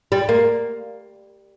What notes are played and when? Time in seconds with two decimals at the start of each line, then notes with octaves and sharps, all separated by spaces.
0.12 G3
0.29 A#3